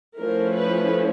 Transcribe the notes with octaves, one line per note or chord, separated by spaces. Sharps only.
F3 A3 C#4 E4 A#4
B4